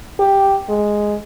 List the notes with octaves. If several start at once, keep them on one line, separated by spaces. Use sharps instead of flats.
G4
G#3